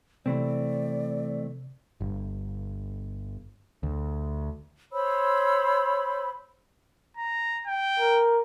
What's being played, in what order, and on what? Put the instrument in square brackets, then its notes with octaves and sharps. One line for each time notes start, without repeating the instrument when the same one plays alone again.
[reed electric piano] C3 [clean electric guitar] E3 A3 C4 [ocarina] D5
[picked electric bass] G1
D2
[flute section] C5 C#5 B5 E6
[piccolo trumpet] A#5
G5
[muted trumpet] A#4